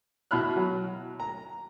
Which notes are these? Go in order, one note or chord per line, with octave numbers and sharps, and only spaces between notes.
B2 E4 B5 F6 F#6
F#3
A#5